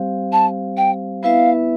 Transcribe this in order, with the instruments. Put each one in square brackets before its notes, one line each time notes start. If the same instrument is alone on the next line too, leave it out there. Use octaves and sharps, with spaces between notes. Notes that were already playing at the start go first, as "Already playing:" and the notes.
Already playing: [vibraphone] G3 C4 G4 C5 F5
[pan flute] A5
G5
[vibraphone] B3 E4 B4 E5 [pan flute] F5